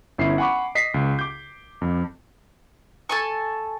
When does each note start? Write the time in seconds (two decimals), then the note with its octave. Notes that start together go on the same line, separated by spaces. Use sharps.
0.18 G1 C#4 E4 C7
0.38 F#5 G#5 B5 C#6 D6
0.75 D#5 B6 C7
0.94 C#2
1.19 D6 G6
1.81 F2
3.09 A4 G#5 C#6